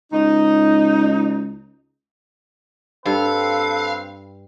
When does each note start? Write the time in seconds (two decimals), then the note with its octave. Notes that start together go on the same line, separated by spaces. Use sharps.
0.13 C#2 D#4
3.06 G2 C4 A4 B4 F5